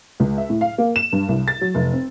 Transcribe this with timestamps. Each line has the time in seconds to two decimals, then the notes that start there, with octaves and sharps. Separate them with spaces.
0.20 C#2
0.38 E5
0.49 A2
0.61 F5
0.78 A#3
0.96 E7
1.12 G2
1.29 C2
1.48 A6
1.61 F#3
1.75 F1
1.93 C4